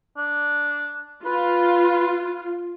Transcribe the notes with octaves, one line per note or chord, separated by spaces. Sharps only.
D4
F4 B4